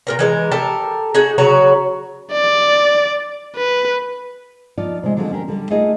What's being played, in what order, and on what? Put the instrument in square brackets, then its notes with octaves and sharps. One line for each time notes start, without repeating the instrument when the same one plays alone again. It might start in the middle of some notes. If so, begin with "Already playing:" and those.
[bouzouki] A#2 A#4 A#5
E3 G#3 A#4
G4 A4 A#4 A5
D#4 F#4 G#4
C#3 F#3 F#4 A#5
[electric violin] D5
B4
[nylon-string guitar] F3 D#4 F4 D5
C3 G#3
D3 F3 F#3 G#3 C4
C#4 D4 G4 A#4
D3 G3 G4
A3 A#3 D#4 F4 G#4 D#5